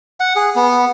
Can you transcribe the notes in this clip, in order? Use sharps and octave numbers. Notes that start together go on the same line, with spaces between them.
F#5
G#4
B3